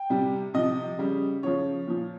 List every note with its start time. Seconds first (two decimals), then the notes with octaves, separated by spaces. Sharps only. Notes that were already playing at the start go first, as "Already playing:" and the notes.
Already playing: G5
0.10 C3 G3
0.54 C3 F3 D#5
0.98 C#3 G3
1.43 C#3 F3 C#5
1.87 A#2 F3